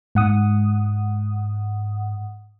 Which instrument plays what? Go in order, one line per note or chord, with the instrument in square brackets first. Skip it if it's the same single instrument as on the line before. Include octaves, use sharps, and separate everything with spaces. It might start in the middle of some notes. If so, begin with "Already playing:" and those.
[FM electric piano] G#2 F#5 D#6